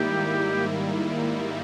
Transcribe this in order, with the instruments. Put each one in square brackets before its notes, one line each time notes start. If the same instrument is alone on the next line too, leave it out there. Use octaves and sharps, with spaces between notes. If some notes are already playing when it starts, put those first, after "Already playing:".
Already playing: [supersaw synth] G#2 D#3 G3 A#3 E4 [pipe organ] G4